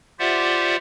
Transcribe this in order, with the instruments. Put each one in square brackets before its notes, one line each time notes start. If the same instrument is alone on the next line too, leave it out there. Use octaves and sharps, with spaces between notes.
[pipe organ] F4 G4 C5 D5 E5 F#5